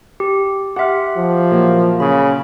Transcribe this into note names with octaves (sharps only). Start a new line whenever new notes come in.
G4
G4 E5 F#5 C6 F6
F3
A#2 F#3 A#3
C#3 B5